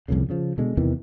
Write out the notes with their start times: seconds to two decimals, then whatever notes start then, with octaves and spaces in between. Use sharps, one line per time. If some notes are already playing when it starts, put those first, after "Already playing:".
0.08 C2 F2 A#2 C#3
0.30 C#3 F3
0.58 B2 D3 G#3
0.77 E2 C3 D#3 E3